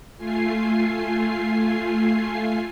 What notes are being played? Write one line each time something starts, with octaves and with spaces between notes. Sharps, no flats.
A3 F4 G#5 C7